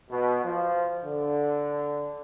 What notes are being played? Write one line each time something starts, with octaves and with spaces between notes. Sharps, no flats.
B2
F3
D3